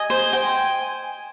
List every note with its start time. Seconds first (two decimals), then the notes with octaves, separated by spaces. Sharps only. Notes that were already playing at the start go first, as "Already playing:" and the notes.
Already playing: D#5 G#5
0.10 C5
0.33 G5